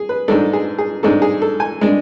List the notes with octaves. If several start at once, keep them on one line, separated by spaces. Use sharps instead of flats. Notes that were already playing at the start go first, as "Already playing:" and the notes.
Already playing: G#4
B4
G#2 G#3 D4 A4
G#4
G#4
G#2 G#3 D4 A4
G#4
A4
G#5
G#3 D4